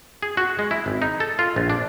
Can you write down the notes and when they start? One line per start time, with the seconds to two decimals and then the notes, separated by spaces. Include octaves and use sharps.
0.23 G#4
0.37 F#4
0.59 G#3
0.71 E4
0.86 G#1
1.02 D#4
1.20 A4
1.39 F4
1.56 A#1
1.70 D4